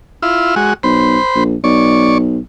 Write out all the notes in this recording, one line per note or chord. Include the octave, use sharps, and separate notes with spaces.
E4 F4
G#3 F#4
B1 C5 B5
A#1
B1 D5 C#6